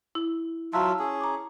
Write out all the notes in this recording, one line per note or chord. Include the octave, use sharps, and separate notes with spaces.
E4
F#3 F4 E5 A5 A#5
C#4 G#4
A#5 D6